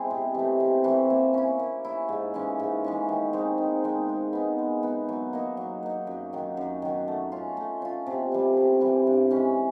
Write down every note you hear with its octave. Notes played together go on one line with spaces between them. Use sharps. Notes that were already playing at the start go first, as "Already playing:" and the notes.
Already playing: G#3 C4 E4 G#4
C3
E3 A3
C3
E3 A3
A#3
C#4 E4
A#3
C#4 E4
G#2
E3 G#3 C#4
G#2
E3 G#3 C#4
D#3
G#3 C4 D#4
D#3
G#3 C4 D#4
G#3
B3 D#4
G#3
B3 D#4
F#3
A#3 D#4
F#3
A#3 D#4
F#2
D#3 F#3
F#2
D#3 F#3
A3
C#4 F4
A3
C#4 F4
C3
E3 G3
C3
E3 G3
G2
E3 G#3 C#4